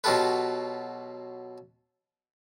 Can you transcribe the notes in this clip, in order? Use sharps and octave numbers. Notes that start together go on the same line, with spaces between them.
B2 F#3 F4 G4 A4 B4